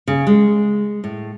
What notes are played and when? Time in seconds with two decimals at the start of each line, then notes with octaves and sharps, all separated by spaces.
0.08 C#3
0.27 G#3
1.04 A2